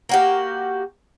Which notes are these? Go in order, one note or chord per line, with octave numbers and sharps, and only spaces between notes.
A#3 F#4 G4